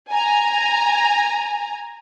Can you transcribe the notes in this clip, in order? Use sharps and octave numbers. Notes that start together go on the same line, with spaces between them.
G#5 A#5